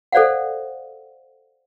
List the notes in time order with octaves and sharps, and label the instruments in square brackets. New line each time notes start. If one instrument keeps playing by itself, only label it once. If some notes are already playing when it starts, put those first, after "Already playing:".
[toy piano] A4 C5 D5 F5 F#5